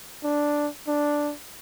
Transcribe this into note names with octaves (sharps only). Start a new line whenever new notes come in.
D4
D4